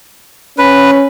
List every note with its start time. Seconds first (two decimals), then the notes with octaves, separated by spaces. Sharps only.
0.58 C#4 B4